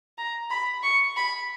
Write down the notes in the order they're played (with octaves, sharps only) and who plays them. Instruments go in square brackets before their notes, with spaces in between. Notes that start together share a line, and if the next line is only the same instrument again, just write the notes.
[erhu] A#5
B5
C#6
B5